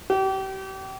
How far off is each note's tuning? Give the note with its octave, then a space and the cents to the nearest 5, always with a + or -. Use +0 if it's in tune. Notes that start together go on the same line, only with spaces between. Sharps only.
G4 -35